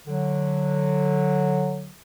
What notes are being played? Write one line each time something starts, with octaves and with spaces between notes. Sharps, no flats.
D3 F#3